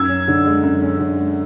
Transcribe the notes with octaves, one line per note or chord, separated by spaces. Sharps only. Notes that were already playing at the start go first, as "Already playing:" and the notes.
Already playing: F#2 E6 G#6
C#4
D3
G#3
F#2
C#4
D3
G#3